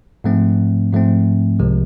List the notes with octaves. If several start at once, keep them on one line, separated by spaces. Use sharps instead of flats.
G#2 F3 A3 C4
G#2 F3 A3 C4
C2 C3 F3 G#3